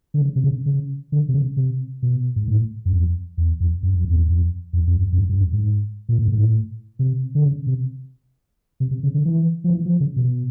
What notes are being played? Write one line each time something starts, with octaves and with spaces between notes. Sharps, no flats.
D3
C#3
C3
C#3
C#3
D3
C3
C#3
C3
B2
G#2
A2
F#2
F2
E2
F2
F#2
F2
E2
F2
F2
F2
F2
F#2
F#2
G2
G2
F#2
G#2
A#2
A2
G#2
A2
C3
D3
C#3
C3
C3
C3
C#3
D3
E3
F3
E3
F3
C#3
B2